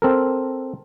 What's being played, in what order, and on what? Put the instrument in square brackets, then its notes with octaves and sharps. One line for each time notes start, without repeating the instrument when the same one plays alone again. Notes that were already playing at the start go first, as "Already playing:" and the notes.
[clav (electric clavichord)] C4 A4 A#4